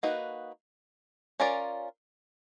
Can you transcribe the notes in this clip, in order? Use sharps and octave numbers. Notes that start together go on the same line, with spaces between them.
A#3 D#4 F#4 B4
C#4 F4 A#4 D5